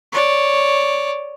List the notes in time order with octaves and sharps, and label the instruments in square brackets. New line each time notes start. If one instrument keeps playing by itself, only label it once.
[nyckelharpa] C#5 D5